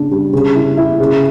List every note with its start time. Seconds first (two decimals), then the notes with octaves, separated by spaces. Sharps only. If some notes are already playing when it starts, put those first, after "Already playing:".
Already playing: C#3 D4
0.11 G3
0.33 C#3
0.55 E4
0.77 E4
1.00 C#3